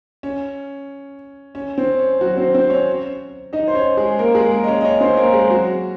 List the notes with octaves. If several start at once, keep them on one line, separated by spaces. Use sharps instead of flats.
C#4
C#4
C4
C#4
F#3 F#4
C4 C5
C4 C5
C#4 C#5
D#4 D#5
C5
C#4 C#5
G#3 G#4
A#3 A#4
G#3 G#4
A#3 A#4
D#5
C#4 C#5
D#5
C#4 C#5
C4 C5
A#3 A#4
G#3 G#4
F#3 F#4